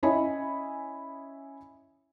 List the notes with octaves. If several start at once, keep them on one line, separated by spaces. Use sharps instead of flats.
C#4 E4 C#5 D#5 G#5 B5